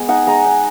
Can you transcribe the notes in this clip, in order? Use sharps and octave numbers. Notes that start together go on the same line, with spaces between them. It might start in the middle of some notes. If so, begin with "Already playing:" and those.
Already playing: G#3 B3 G#5
D#4 F#5
G#3 A#5
D#4